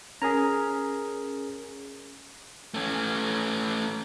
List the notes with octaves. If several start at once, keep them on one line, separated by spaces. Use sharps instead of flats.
C#4 G#4 A#4 A#5
A3 C#4